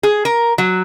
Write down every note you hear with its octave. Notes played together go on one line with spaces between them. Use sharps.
G#4
A#4
F#3